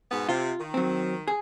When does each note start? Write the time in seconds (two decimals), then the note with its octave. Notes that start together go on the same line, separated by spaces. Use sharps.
0.11 G#2 B2 B3
0.29 C3 F4
0.59 D#3
0.74 F#3 C4
1.28 G#4